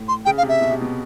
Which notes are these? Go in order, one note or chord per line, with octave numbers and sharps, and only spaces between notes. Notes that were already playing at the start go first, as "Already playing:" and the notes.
Already playing: A2
C6
C#3 G5
F5
C3
E5
B2
C3
B2